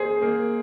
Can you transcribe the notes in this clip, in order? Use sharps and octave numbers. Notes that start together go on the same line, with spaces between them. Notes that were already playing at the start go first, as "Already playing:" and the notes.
Already playing: A#3 G#4 C5
A#3